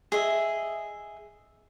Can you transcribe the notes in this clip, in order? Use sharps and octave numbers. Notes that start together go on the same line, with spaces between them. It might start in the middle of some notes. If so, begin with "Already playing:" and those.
G#4 D#5 E5